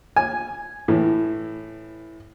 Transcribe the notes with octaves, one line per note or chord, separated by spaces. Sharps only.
G#5
A2 E3